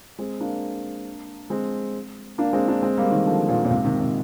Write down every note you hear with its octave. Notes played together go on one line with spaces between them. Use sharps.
G#3 C4
A#3 D4
G#3 C4
A#3 D4
G#3 C4
A#3 D4
G#3 C4
G3 A#3
D#3 G3
D3 F3
A#2 D3
A#2
G#2 C3
C3 D#3
C3 D#3